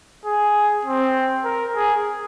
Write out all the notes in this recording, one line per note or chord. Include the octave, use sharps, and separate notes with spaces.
G#4
C4
A#4
G#4